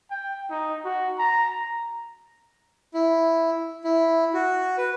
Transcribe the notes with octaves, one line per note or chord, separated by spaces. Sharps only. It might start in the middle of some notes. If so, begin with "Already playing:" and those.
G5
D#4
F#4
A#5
E4
E4
F#4
B4